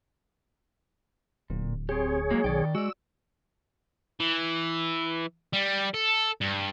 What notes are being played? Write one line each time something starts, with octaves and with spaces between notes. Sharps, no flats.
D1 A#2
C4 G4 G#4 C#5
F#3 G#3 A#3
B1 D#3 D5 G5
G#3 F#4 D5 E6
E3
G3
A4
G2